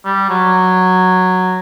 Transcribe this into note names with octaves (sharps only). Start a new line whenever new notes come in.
G3
F#3